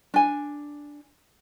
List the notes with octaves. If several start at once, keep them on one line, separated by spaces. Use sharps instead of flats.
D4 G#5